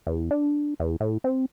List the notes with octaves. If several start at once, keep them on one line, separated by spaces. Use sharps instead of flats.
E2
D4
E2
A2
C4